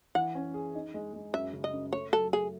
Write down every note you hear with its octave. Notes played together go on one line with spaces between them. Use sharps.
E3 F#5
C#4
G#4
D#4
G#3
G#3
F#2 E5
C#3
D#5
F#2
A3 C#5
F#3 A4
A3 G#4